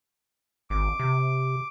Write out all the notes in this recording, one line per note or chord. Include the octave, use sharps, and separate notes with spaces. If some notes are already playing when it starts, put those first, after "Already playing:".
G#1 D6
C3